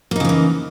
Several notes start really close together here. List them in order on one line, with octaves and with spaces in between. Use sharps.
A#3 D#4 C#3 F3 E3